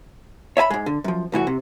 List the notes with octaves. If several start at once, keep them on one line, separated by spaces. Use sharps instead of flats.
C#5 E5 G#5 B5
G#2 G#3
D3
F#2 F3
C2 A2 E3 F#4
C3